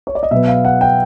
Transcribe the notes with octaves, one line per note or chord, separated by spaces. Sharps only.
C#5
D5
D#5
B2 F#3 B3 E5
F5
F#5
G5